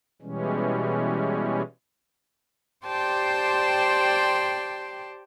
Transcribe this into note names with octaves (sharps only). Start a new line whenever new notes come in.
B2 E3 G3 G#3 C#4
G4 C5 D5 G5 A5 C6